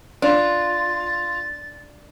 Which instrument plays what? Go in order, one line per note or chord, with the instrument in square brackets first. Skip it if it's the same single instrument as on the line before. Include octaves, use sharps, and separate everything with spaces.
[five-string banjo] D4 [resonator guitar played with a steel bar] F4 [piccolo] A6